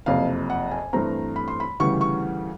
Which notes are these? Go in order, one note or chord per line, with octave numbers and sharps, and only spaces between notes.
F#1 F2 C3 F5
F#5
G#5
G2 E3 A3 C4 A#5
B5
C6
B5
D2 C#3 E3 G3 C#6
C#6